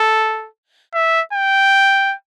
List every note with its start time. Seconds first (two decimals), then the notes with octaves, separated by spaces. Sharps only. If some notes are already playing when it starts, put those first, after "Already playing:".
Already playing: A4
0.94 E5
1.33 G5